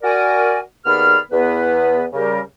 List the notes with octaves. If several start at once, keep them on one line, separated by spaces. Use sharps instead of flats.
F#4 A#4 D5 G#5
D#2 B3 G#4 D5 B5 F6
E2 B3 B4
C#3 G3 G4 A#4